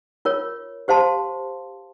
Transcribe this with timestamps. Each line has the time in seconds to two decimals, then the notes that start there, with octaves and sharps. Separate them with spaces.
0.25 F4 A#4 C#5
0.88 G4 C5 F5 A5 C6